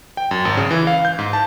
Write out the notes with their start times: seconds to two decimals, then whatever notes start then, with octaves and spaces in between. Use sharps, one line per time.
0.17 G5
0.31 F#2
0.45 G#1
0.57 C#3
0.71 E3
0.87 F5
1.05 G6
1.19 G#2
1.33 A5